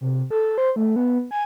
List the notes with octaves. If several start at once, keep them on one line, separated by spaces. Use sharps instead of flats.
C3
A4
C5
A3
B3
G#5